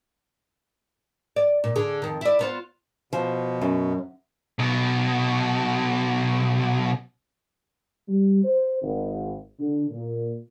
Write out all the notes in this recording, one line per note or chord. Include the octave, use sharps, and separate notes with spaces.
D5
A#2
D3 G#4
F2 D#3
E4 D5
B3 F4 C5
B2 F3
F#2
B1 B2
G3
C5
G#1
D3
A#2